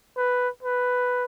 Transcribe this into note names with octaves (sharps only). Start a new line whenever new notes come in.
B4
B4